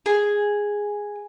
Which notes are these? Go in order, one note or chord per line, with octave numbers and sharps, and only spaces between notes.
G#4